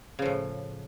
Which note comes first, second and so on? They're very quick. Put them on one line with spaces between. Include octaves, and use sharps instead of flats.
C#3 F3 A2